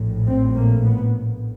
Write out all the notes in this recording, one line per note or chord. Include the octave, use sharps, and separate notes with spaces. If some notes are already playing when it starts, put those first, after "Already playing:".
Already playing: A#1 A2
C4
A#3
B3